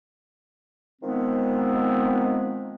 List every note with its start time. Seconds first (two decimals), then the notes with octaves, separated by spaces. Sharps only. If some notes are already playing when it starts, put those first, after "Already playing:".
1.02 D#3 F3 G#3 B3 C4